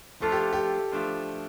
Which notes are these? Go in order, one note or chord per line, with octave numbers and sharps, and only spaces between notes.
F3 A3 D4 F4 A4
G4
G4
F3 A3 D4 F4